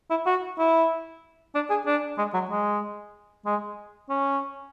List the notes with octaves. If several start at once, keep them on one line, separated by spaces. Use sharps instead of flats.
E4
F#4
E4
D4
G#4
D4
G#3
F#3
G#3
G#3
C#4